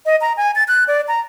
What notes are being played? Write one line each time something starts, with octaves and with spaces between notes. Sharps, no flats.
D#5
A#5
G#5
A6
F#6
D5
A#5